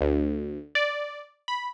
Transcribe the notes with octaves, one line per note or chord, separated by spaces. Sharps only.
D2
D5
B5